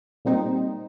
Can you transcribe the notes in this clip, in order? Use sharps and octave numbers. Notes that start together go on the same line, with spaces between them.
A#2 G3 C4 D#4